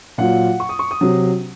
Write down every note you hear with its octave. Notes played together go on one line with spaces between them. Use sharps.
A#2 F#3 F#5
C#6
D#6
C#6
D#6
C3 F#3